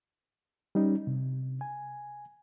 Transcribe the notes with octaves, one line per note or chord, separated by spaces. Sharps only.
G3 C#4 D#4
C3
G#5